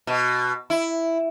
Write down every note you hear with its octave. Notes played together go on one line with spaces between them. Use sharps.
B2
E4